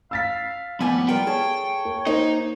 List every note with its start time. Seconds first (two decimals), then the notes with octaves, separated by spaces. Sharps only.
0.11 F5 E6 A6 B6
0.81 F2 A2 D#3 G3 B3 G#5
1.09 G3 B3 F4 A#4 G5
1.27 G#4 A4 C#5
1.85 A#3
2.07 A#3 D#4 C5 D#5